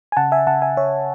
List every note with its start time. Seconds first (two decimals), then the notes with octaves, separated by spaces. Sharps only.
0.12 G#5
0.17 C#3 F#5 A5
0.32 E5 G#5
0.47 C#3 F#5 A5
0.62 E5 G#5
0.77 C#3 C#5 E5